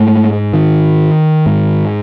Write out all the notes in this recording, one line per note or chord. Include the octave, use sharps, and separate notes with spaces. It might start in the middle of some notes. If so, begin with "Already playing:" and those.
Already playing: G#2 A3
D#3
G#2